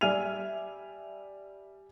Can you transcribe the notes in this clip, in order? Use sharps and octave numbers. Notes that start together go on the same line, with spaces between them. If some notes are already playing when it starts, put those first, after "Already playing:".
G3 E5 G#5 F6 D#7 F7